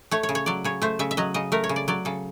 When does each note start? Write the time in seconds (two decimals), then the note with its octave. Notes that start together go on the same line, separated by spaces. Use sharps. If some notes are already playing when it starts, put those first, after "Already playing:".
0.11 A3 C#5
0.23 C#5
0.29 C#3
0.35 C#5
0.46 F#3 D5
0.64 C#3 C#5
0.82 A3 C5
0.99 C#3 E5
1.11 E5
1.17 F#3 D#5
1.34 C#3 D#5
1.52 A3 A#4
1.64 C#5
1.69 C#3
1.76 D5
1.88 F#3 D5
2.05 C#3 A4